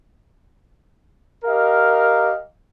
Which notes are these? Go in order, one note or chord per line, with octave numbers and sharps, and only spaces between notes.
G4 A#4 D#5 F5